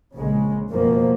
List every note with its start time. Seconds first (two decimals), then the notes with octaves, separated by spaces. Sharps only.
0.15 A#1 C#3 G#3
0.68 F#1 F2 B2 F3 A#3